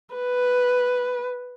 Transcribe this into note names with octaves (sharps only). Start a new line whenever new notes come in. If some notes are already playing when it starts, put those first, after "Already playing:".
B4